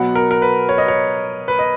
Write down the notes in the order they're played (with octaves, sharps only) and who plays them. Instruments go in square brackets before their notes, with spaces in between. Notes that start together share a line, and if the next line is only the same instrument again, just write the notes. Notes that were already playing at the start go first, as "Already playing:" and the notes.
Already playing: [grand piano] B2 F#3 B3 F#5
A#4
A#4
B4
C#5
D#5
C#5
B4
D#5